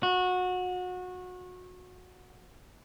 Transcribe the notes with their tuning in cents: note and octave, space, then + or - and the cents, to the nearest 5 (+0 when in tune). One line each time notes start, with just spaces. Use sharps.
F#4 -25